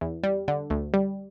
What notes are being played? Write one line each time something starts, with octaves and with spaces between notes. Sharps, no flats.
E2
G3
D3
D2
G3